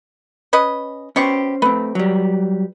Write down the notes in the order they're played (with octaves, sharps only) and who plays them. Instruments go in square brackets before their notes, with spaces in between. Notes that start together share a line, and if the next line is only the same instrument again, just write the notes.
[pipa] C#4 B4 D#5
[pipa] B2 G4 C#6 [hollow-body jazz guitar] C#4 C5
[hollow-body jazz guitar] A3 C4 [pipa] B4
[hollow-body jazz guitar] F#3 G3